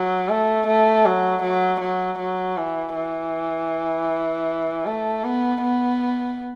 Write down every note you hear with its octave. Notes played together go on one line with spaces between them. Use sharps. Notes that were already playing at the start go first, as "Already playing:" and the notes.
Already playing: F#3
A3
A3
F#3
F#3
F#3
F#3
E3
E3
A3
B3
B3